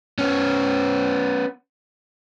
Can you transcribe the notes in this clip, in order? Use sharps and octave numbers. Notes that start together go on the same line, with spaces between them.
B3 C#4